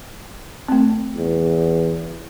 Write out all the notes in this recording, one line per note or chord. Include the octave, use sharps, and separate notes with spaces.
A3 C4
E2